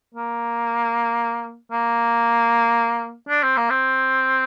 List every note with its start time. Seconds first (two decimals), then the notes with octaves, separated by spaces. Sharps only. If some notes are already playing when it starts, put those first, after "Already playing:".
0.14 A#3
1.72 A#3
3.29 D4
3.43 C4
3.57 A#3
3.70 C4